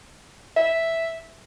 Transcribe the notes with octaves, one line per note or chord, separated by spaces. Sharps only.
E5